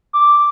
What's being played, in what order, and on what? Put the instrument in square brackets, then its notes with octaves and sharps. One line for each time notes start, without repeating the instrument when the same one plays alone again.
[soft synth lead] D6